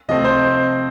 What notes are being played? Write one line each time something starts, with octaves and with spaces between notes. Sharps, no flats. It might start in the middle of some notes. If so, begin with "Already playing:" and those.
C3 F3 A3 C4 D#5
C5